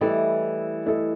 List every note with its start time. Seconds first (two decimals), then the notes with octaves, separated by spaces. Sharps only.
0.01 E3 G3 A3 E4 A4 D#5
0.86 A3 E4 A4 D#5